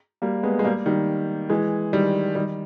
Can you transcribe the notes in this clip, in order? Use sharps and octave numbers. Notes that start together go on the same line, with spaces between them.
G3 A#3
G#3 B3
G#3
G3 A#3
D#3 G3
E3 G#3
D#3 G3
D#3 G3